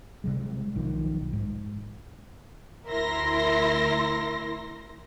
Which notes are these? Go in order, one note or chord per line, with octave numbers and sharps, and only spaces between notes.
C3 G3 G#3
B1 D#3 F3
G#2
D2 E4 A#4 E5 C6 A#6